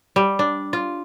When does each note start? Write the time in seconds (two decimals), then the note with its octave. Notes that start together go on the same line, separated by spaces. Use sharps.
0.16 G3
0.39 D4
0.73 F4